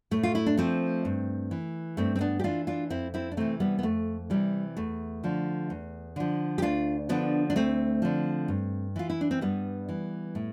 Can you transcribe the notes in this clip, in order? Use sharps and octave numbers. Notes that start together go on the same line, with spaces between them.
A2 A3
F4
E4
D4
F3 A3 C4
G2
E3
G2 A3 C4
C4
B3 D4
G4
E3 D4 F4
D4 F4
F2 C4 E4
C4 E4
D4
C3 E3 A3 C4
G3 B3
B3
F2 A3
C3 E3 G3
E2 A3
D3 F3
E2
D3 F3
G4
D2 D4 F4
D3 F3 B3 D4
D4
D2 A3 C4
D3 F3
G2
E3 F4
E4
D4
C4
G2 G3 B3
E3
A2